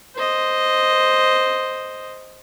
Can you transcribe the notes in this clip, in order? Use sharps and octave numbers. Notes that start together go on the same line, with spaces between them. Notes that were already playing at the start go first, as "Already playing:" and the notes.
C5 D#5